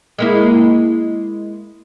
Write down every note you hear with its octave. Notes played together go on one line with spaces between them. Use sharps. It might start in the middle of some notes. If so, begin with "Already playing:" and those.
G#3 A#3 E4